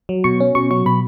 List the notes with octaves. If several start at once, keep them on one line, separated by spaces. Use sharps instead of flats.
F#3
B2 C#6
C#4
B2 C#6
F#3 C#6
B2 B5